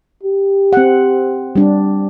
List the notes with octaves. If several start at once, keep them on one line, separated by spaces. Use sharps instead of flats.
G4
C4 F#5
G3 D4